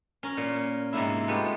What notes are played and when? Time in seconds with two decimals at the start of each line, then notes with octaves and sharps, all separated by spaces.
0.23 C#4 A#4
0.37 A#2
0.93 G#2 C3 A#3 E4
1.28 G#3 A3 B3 F4 G4